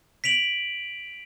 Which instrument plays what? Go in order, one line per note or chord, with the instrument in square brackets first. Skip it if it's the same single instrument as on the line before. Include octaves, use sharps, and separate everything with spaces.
[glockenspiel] B6 D7 F7 F#7